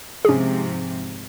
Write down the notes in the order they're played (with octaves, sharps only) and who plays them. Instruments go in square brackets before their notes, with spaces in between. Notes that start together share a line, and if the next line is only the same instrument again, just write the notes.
[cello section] G#2 C3 F3 [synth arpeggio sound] C#4 G#4